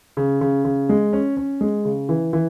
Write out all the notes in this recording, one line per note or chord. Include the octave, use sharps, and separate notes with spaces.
C#3
C#3
C#3
G#3
C#4
C#4
G#3
C#3
E3
E3